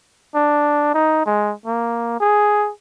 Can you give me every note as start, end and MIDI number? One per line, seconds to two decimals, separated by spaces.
0.35 0.90 62
0.94 1.23 63
1.26 1.53 56
1.66 2.19 58
2.20 2.70 68